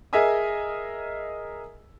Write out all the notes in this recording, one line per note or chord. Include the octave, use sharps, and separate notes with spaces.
G#4 A#4 D#5 E5 G#5 D#6